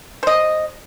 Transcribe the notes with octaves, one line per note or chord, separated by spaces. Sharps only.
C5 D#5